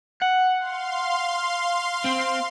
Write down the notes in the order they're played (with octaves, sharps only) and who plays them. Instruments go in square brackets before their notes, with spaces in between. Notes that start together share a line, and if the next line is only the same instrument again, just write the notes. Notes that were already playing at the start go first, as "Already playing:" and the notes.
[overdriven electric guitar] F#5
[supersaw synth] F5 C6
[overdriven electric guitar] C4